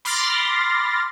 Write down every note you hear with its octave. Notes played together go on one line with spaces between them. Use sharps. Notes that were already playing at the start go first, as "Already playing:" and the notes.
B5 C6 D6 F6 A6 A#6